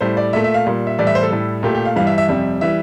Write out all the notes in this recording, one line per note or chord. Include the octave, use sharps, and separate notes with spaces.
A2 G3 C5
D5
A#2 A3 E5
E5
F5
A#2 G3
E5
A2 E3 G3 D5
E5
C5
A4
A2 G3
A#2 A3 G4
G4
F5
G2 E3 G3 F5
E5
E5
F2 C3 G3 E5
E3 G3 E5